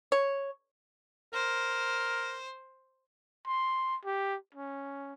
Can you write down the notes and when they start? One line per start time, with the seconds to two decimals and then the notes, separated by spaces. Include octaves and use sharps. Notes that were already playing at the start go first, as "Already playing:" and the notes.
0.12 C#5
1.34 A#4 C5
3.46 C6
4.05 G4
4.54 C#4